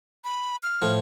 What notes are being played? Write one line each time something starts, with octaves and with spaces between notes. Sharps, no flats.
B5
F6
A2 F3